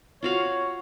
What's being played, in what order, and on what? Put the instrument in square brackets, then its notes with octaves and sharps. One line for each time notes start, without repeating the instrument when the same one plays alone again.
[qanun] F4 F#4 F5 [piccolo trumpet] C#5